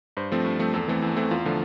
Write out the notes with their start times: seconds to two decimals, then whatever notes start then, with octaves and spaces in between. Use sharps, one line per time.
0.17 G2 C5
0.32 F3 A3 C4
0.45 G2
0.59 F3 A3 C4
0.73 E2 A4
0.88 E3 A3 C4
1.02 E2
1.16 E3 A3 C4
1.31 E2 F4
1.46 D3 F3 A3